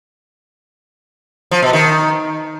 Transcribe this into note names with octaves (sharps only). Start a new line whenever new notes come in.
F3
B2
D#3